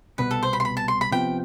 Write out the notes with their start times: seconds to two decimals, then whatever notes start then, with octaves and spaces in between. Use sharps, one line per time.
0.18 C2 B2 B3 B4
0.31 A4
0.43 C5
0.53 B5
0.60 C6
0.65 B5
0.77 A5
0.88 C6
1.01 B5
1.12 C3 F3 B3 G5